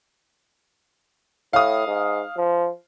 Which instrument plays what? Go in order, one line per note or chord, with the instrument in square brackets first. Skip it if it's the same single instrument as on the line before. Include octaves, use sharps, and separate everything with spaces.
[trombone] A2 [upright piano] F5 D#6
[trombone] G#2
F3